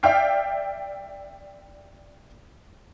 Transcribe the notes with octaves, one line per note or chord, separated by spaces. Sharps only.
D5 E5 F5 G5 F6 C7